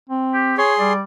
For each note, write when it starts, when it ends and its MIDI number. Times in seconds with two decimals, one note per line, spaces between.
0.09 0.57 60
0.34 0.57 67
0.58 0.93 68
0.58 0.73 73
0.58 0.93 84
0.79 1.03 55
0.79 1.01 74